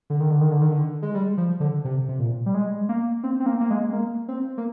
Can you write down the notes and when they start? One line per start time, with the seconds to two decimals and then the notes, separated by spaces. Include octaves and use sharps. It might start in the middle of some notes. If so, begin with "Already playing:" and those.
0.10 D3
0.20 D#3
0.30 D3
0.41 D#3
0.51 D3
0.62 D#3
0.71 D3
1.02 G#3
1.15 G3
1.38 F3
1.60 D3
1.85 C3
2.09 C3
2.19 A#2
2.46 G3
2.54 G#3
2.89 A#3
3.24 C4
3.40 C4
3.46 A#3
3.60 A#3
3.70 G#3
3.93 A#3
4.28 C4
4.58 A#3